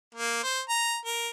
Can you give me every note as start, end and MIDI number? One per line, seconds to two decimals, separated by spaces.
0.15 0.40 58
0.43 0.60 72
0.69 0.97 82
1.06 1.29 70